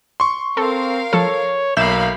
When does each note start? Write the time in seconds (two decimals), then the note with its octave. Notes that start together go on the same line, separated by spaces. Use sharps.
0.20 C6 C#6
0.57 C4 A4 A#4 F5
1.13 F3 A4 C#5
1.77 B1 A#3 E5 F5 B5 G6 E7